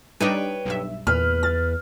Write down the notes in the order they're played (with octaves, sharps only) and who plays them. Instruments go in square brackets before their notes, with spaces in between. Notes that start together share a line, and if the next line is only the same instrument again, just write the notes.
[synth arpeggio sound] G3 D4 D#4 [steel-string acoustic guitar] B4 C#5 G5
[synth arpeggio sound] B1 G2 E5
[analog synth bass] E2 [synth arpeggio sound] A#2 [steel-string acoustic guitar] B4 [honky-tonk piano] F6
[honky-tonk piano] F6 [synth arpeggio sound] A6